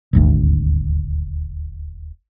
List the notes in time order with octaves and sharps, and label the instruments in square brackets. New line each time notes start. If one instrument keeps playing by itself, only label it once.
[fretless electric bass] D#1 G#1 D2